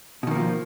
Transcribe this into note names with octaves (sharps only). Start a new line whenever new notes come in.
B2 D#3 F3 A#3